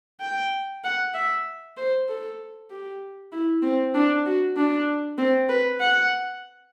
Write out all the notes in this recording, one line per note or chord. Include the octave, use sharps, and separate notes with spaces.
G5
F#5
E5
C5
A4
G4
E4
C4
D4
F#4
D4
C4
B4
F#5